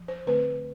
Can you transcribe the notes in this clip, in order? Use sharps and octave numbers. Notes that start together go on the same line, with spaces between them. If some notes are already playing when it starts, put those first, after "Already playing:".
Already playing: F3
C5
D3 A3 C4 B4